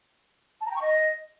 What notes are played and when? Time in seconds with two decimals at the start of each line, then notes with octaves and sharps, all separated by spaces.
0.60 A5
0.65 A#5
0.70 G5
0.76 C#6
0.81 D#5